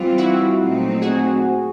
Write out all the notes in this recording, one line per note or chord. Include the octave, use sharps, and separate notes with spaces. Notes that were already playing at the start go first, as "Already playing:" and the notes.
Already playing: E3 G3 C4 F4
E4 F#4
A#2 F#3 A3 C4 D#4
F#4 G#4